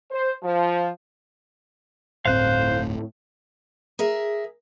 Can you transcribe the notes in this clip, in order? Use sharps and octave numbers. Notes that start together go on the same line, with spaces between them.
C5
F3
D1 G1 A2 C4 C5 F5 F#6
G#4 A#4 E5